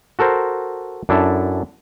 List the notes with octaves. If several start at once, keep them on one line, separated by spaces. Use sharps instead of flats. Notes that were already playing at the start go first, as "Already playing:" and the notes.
F#4 A4 A#4 C5
F#2 D4 E4 A4